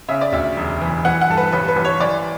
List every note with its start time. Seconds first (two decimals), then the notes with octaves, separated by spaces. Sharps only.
0.09 C#3 E5
0.21 D5
0.32 D2 E5
0.57 E1
0.82 E3
1.05 E3 F#5
1.21 F#5
1.29 G2 A4
1.37 B4
1.52 A1 B4
1.68 B4
1.76 A1
1.85 C#5
2.00 E3 D5